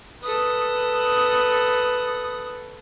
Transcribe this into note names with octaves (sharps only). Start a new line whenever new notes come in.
A4 B4 D#6